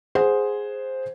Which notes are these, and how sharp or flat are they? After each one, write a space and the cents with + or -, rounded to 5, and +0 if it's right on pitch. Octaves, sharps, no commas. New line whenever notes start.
G#4 +0 C5 +0 F#5 +0